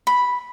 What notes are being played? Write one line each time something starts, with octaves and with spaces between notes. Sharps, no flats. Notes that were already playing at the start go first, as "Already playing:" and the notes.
B5